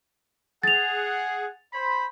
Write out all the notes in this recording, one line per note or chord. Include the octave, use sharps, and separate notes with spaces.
G#4 F#5 A6 F7
C5 B5